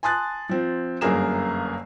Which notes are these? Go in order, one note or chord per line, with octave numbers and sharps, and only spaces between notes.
G#5 A5 C6 D#6 F#6 A6
F3 C4
G1 F#2 A#3 G#4 A#5 E7